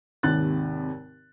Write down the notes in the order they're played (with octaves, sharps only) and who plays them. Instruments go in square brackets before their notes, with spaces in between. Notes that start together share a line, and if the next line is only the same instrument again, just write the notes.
[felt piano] G#1 D#2 C3 F#6 A6